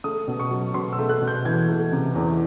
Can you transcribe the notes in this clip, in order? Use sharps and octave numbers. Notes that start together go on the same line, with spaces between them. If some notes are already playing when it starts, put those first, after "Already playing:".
A3 D#6
B2
C#6
F#3
B2 C6
E6
A3
F#6
B2
G6
E3 G#6
A3
C3
E2